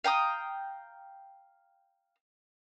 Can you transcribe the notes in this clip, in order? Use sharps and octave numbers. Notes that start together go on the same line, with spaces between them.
F5 G5 A#5 D#6